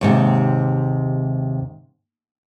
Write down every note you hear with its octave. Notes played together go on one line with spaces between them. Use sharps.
D#2 G#2 C3